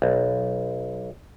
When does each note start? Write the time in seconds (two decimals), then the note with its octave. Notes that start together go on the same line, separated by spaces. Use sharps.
0.02 B1